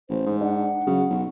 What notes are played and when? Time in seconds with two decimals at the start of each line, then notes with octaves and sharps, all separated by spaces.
0.10 A1 C5
0.26 G#2
0.41 D4 F#5
0.87 C#3 F#3
1.10 B1